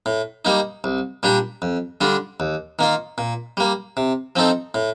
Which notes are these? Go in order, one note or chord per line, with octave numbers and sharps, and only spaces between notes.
A2
G3 A#3 D#4
C2
A#2 G3 D4 G4
F2
D3 G3 D4 F4
D#2
D#3 A#3 F4
A#2
G3 A#3
C3
F3 C4 D#4 A4
A2